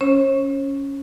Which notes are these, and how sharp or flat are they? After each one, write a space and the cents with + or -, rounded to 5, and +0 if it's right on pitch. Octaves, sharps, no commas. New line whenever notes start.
C#4 +0 C#5 -45